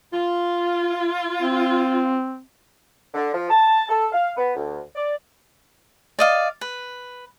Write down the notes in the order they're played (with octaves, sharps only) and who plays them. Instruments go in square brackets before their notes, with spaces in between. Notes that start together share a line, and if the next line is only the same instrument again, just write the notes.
[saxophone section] F4
[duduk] C4
[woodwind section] D3
F3
A5
A4
F5
B3
D2
D5
[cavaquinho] D5 D#5 F5
B4